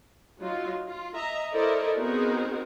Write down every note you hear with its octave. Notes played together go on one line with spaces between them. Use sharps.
F#3 D#4 F4 F#4
F4
D#5 E5 A#5
E4 A4 A#4 C5 D5 D#5
B3 C4 D#4 F#4 G#4 A#4